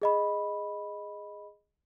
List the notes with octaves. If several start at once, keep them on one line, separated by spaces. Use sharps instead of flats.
G#4 D#5 B5